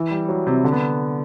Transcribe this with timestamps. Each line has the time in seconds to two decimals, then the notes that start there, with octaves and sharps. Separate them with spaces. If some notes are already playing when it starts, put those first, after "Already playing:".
Already playing: E3
0.11 G3
0.29 F#3
0.47 C3
0.64 D3
0.72 B3